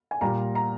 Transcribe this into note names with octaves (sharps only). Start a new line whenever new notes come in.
G#5
A#2 G3 A#3 A#5
A#5